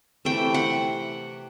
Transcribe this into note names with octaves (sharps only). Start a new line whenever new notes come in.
C3 E3 A3 G5
F#5